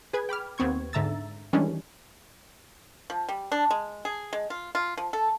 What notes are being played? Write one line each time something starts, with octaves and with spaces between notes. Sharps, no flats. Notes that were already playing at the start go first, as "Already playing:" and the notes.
G#4 B4 G#6
G5 B5 D6 F6
D#2 B3 C4 C#6 G#6
G#2 D3 E5 A#5 E6 A6
D#3 E3 G3 G#3 C#4 D4
F3
G3
D4
G#3
G#4
G#3
F4
F4
F3
A4